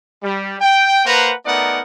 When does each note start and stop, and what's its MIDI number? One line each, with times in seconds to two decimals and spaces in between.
0.23 0.55 55
0.60 1.04 79
1.06 1.34 58
1.06 1.34 71
1.06 1.34 72
1.06 1.34 78
1.06 1.34 82
1.46 1.81 57
1.46 1.81 59
1.46 1.81 63
1.46 1.81 70
1.46 1.81 74
1.46 1.81 78